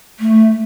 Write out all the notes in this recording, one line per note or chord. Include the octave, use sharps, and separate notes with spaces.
A3